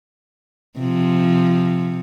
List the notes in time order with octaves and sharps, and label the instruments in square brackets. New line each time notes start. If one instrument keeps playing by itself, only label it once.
[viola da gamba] C3 F3